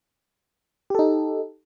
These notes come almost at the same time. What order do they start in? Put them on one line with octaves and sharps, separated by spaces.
G4 A4 D#4